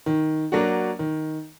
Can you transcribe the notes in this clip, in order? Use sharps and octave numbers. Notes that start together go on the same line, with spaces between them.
D#3
F#3 A#3 D4 F#4
D#3